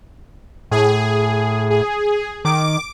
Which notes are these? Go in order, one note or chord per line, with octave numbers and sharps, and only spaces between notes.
A2 G#4
G#4
D#3 D6